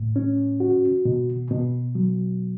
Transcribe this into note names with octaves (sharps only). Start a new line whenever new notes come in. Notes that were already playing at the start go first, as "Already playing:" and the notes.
Already playing: A2
C#4
F#4
B2
B2
F#3